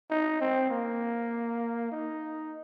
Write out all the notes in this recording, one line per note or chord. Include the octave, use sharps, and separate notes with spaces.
D#4
C4
A#3
D#4